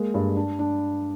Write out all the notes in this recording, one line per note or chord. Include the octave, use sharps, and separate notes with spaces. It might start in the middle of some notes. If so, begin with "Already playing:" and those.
Already playing: G#3 A#3
G2
D4
D4